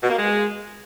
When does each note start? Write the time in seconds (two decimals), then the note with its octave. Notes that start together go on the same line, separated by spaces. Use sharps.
0.02 B2
0.10 A#3
0.19 G#3